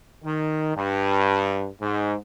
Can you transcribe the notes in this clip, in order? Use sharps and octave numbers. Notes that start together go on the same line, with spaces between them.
D#3
G2
G#2